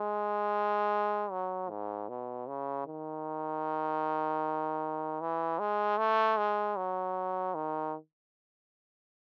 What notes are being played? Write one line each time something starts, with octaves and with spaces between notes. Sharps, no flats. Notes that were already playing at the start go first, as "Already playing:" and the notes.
Already playing: G#3
F#3
G#2
B2
C#3
D#3
E3
G#3
A3
G#3
F#3
D#3